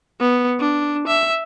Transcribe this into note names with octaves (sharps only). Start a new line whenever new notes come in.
B3
D4
E5